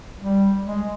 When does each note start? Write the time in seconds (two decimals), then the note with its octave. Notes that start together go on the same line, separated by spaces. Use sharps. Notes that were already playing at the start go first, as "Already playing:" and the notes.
0.20 G3
0.65 G#3